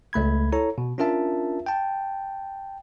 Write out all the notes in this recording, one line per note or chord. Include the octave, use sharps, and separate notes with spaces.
C#2 A3 B5 G#6
E4 A4 C#5 A#5
B2
C#4 D4 F4 A#4 E5 A5
G5 A5